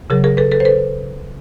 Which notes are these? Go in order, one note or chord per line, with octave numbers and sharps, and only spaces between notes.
C#3 F#3 G#4 A#4
G#4 A#4
A4 B4
A4 B4
C5
A4 B4